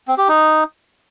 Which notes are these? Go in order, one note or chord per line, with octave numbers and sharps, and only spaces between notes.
C4
G4
D#4